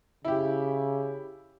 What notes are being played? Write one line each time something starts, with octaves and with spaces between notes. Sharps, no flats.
C#3 E4 G4